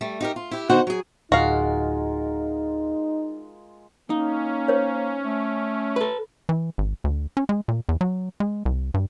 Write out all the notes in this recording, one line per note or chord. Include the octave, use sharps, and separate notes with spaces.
G3 A3
D#4 G4 A#4
F4
E4 G4
D3 B3 D#4 F#4 C5 F#5
F#3 G#4
D1 G#3 D#4 F4 F#4 A#4 F5
A#3 C#4 D#4
C5 C#5
A3
A4 B4
E3
G#1
D2
C#4
G#3
A#2
E2
F#3
G#3
C2
G2